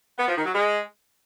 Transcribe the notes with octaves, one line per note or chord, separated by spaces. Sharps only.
B3
F3
D#3
F#3
G#3